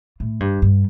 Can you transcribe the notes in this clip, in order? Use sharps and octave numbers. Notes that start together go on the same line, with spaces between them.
A2
G2
G2